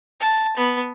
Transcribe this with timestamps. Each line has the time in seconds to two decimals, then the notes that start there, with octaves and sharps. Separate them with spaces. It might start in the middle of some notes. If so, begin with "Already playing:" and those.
0.20 A5
0.57 B3